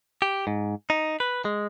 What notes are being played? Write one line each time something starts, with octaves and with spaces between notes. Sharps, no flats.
G4
G#2
D#4
B4
G#3